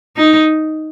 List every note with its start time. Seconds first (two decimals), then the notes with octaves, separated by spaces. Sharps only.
0.17 D#4